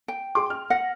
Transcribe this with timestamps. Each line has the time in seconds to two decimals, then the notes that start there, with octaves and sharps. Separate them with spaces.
0.08 G5
0.35 G#4 C6 D6
0.50 F6
0.70 F#5 A#6